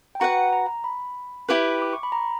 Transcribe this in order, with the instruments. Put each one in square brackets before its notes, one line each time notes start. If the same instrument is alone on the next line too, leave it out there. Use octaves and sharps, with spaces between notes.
[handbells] G5
[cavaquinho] F#4 B4 F#5 [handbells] A#5
[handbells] A#5
B5
[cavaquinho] E4 G4 B4
[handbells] D6
C#6
B5
A#5